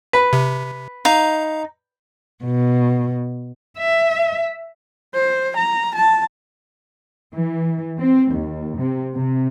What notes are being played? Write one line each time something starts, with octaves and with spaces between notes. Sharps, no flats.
B4
C3
D#4 F5 A#5
B2
E5
C5
A#5
A5
E3
C4
D#2
C3
C3